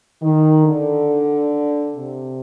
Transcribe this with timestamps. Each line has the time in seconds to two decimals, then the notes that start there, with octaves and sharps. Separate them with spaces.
0.22 D#3
0.65 D3
1.96 C3